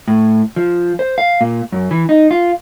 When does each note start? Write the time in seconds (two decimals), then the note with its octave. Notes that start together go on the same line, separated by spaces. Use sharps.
0.08 A2
0.56 F3
0.99 C5
1.18 F5
1.41 A#2
1.72 F#2
1.91 E3
2.09 D#4
2.31 F4